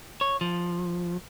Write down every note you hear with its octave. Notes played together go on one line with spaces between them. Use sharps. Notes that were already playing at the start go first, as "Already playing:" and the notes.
C#5
F3